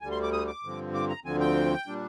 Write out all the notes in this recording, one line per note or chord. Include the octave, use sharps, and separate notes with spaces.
D2 D3 G3 G#5
C6
D6
D#6
D6
G2 D3 F3 C4
D6
A#5
D2 D3 F3 C4 G#5
G5
A#2 G3 D4